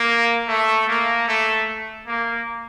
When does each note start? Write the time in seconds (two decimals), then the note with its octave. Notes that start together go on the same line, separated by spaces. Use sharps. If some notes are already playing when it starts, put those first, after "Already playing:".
Already playing: A#3
0.48 A3
0.88 A#3
1.28 A3
2.06 A#3